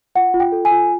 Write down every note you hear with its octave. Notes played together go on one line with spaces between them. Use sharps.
F4 F#5
F4
G5
A4
G#5
F4